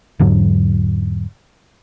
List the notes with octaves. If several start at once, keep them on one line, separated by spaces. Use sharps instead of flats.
E2 G#2 D3 F#3